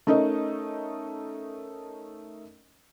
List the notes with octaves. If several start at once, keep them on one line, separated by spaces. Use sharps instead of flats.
A3 C#4 D#4 A#4 D#5